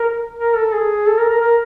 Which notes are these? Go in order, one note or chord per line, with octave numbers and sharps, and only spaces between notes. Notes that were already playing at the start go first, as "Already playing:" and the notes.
Already playing: A#4
A#4
A4
G#4
A4
A#4
A#4
A#4